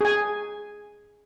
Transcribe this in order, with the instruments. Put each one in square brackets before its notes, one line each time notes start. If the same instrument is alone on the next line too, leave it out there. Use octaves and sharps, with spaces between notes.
[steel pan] G#4 G#5